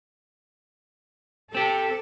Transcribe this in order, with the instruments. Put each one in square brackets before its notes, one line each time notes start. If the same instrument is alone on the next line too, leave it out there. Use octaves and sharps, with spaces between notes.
[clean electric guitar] C4 G4 [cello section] A4